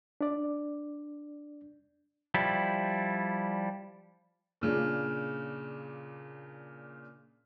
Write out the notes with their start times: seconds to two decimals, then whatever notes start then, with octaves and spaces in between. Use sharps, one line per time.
0.21 D4 D5
2.34 F3 G3 E4
4.61 A#2 C#3 D4